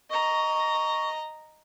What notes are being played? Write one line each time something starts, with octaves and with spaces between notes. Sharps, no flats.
D#5 A#5 C#6